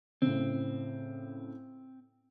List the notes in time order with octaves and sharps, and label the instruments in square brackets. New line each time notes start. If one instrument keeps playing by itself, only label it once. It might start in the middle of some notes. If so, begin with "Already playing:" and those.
[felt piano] A2 C#3 [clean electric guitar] C4